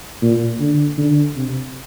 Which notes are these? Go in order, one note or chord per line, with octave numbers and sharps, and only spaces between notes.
A#2
D3
D3
C3